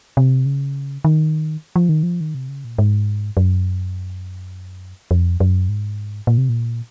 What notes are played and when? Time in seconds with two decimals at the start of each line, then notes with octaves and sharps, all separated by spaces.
0.17 C3
0.46 C#3
1.05 D#3
1.76 F3
1.89 D#3
2.03 F3
2.21 D#3
2.35 C3
2.49 C#3
2.64 A#2
2.79 G#2
3.37 F#2
5.11 F2
5.40 F#2
5.69 G#2
6.27 A#2
6.38 C3
6.49 A#2